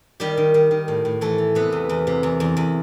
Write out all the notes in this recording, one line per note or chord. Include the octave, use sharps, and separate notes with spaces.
D#3 G3 G4
D#3
D#3
D#3
A2
A2
E3 A3 A4
E3
C3 B3 B4
E2
E2
C3
E2
E2
E2